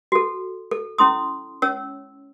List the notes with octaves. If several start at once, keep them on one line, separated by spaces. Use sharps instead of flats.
F#4 A4
A4
C#4 E4 C6 D#6
C#4 C#5 E6